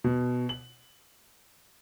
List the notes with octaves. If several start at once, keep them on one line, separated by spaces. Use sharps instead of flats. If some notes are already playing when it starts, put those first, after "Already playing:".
B2
F#7